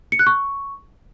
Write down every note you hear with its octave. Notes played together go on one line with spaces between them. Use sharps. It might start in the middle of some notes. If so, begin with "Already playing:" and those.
C#7
F#6
C#6